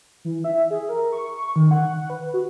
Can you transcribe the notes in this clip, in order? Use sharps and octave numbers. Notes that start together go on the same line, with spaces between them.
E3
E5
G#4
A#4
C#6
C#6
D#3
F#5
F#5
B4
F#4